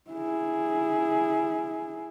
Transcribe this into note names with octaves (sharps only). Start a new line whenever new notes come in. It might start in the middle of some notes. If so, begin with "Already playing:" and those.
E4 G#4